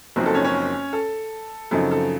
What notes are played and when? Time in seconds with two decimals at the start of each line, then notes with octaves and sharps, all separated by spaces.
0.16 F#1 F#2 F3 C4 D#4
0.26 A4 A5
0.34 C#4 C#5
0.44 C#4 C#5
0.93 A4
1.71 F#2 C#3 F3 C4 D#4 A4
1.91 A4